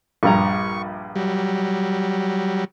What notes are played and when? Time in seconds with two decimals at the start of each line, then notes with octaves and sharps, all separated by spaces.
0.23 A#1 G2 A#5 C#6
1.16 F#3 G3